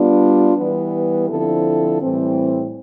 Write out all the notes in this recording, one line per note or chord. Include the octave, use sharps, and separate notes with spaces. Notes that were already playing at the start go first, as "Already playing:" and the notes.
Already playing: G3 B3 D4 F4
E3 G3 B3
D3 F3 C4 E4 A4
A2 E3 G3 C4